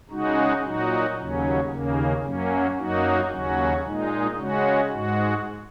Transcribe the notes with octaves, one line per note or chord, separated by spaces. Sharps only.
C#3 G#3 D#4 F#4
A#2 F#3 D#4 F#4
D#2 C#3 F#3 C#4
D#2 C#3 A#3
F#2 F#3 A#3 C#4
F#2 F#3 A#3 D#4 F#4
D#2 C#3 F#3 C#4 F#4
A#2 G#3 D#4
C#3 G#3 C#4 F#4
G#2 G#3 F#4